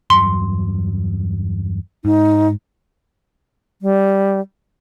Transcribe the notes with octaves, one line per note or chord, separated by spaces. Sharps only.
E2 G2 F#3 C6
G#2 D#4
G3